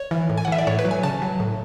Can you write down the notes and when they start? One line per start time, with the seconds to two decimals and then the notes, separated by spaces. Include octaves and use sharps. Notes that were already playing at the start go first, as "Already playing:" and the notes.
Already playing: C#5
0.11 E3
0.30 A2
0.38 G#5
0.45 F#5
0.48 E3 E5
0.58 D5
0.67 A2 C#5
0.79 B4
0.85 F#3
0.91 G#5
1.03 C#3 A5
1.22 F#3
1.40 A2